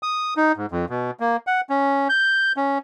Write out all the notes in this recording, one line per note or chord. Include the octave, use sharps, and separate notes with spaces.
D#6
D#4
G#2
F2
B2
A#3
F#5
C#4
G6
C#4